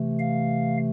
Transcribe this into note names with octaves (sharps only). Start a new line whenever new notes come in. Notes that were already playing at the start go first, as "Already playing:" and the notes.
Already playing: C3 E3 A3
F5